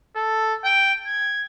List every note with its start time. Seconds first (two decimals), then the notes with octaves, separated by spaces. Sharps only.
0.16 A4
0.64 G5
1.07 G#6